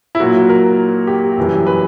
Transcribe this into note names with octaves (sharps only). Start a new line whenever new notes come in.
E4
A#2 F#3 F#4
A#4
G4
F#2 E3 G3
B4